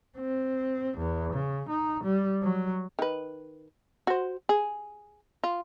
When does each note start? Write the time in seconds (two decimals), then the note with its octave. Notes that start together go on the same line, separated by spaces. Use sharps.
0.18 C4
0.98 E2
1.34 C#3
1.69 D#4
2.04 G3
2.43 F#3
2.99 D#3 B4
4.07 F#4 C5
4.49 G#4
5.44 F4